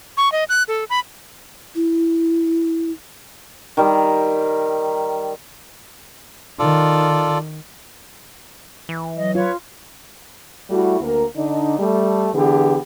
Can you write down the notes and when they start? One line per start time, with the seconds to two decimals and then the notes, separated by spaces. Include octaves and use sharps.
0.17 C#6
0.32 D#5
0.49 F#6
0.68 A4
0.90 B5
1.75 E4
3.77 D#3 G3
6.59 D#3 F4 A4 D5
8.89 E3
9.16 F#3 D#5
9.35 F4 B4 C#5
10.70 G3 A3 E4 F#4
11.01 D2 A#3 A#4
11.36 D3 D4 D#4
11.80 G3 A3
12.35 D3 E3 B3 G4 G#4